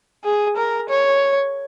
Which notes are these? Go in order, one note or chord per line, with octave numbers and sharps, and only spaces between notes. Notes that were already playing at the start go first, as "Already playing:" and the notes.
G#4
A#4
C#5